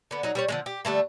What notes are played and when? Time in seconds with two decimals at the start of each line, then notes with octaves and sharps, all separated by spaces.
0.11 D3 B3
0.23 F#3 D#4
0.35 G3 A#4 C#5
0.48 D3 F3 G#3
0.66 G4
0.85 D3 G3 A3 A#3